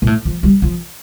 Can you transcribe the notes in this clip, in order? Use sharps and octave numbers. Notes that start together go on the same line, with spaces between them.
A#2
A2
F3
G3
F3